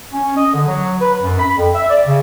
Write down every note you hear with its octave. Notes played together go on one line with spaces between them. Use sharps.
C#4
D#5
D3
F#3
B4
F#2
B5
F2
E5
D5
C#3